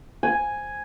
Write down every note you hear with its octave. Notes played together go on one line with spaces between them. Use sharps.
G#5